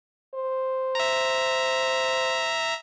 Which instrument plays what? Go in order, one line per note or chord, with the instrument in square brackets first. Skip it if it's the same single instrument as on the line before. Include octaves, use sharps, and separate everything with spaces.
[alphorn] C5
[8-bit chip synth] E5 A#5